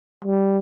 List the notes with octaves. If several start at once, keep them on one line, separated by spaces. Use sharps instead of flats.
G3